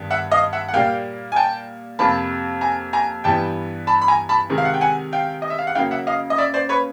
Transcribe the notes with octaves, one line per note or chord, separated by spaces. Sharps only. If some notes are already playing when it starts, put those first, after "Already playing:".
Already playing: G2 D#3 B3
E5 F#5
D#5 F5
E5 F#5
F#5
A#2 G3 A#3 F5 G5
G#5
G5 A5
F2 C3 F3 A#3 A5 B5
G#5 A#5
G#5 A#5
G2 E3 G3 B3 G5 A5
A5 B5
B5
G#5 A#5
A5 B5
C3 D#3 G#3
F5
F#5
G5
F#5 G#5
F5 G5
D#5
E5
F5
F#5
C#3 F#3 A#3 F5 G5
E5 F#5
D#5 F5
D#5
D5 E5
C5 D5
B4 C#5